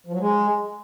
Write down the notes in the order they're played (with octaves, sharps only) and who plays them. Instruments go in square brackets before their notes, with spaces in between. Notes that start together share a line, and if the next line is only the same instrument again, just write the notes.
[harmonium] F3
F#3
G#3